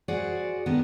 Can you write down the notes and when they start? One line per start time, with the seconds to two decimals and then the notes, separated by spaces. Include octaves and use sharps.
0.08 F#4 G#4 C5 D5
0.66 D3 D#3 B3